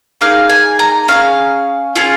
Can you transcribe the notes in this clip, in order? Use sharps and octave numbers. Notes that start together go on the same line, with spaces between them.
A#3 D#4 G#4 F5
G#5
A#5
C#4 F4 G#4 F5
C#4 F4 G#4